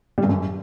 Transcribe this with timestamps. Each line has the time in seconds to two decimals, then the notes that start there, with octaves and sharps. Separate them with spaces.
0.18 G3
0.24 G2
0.29 F#2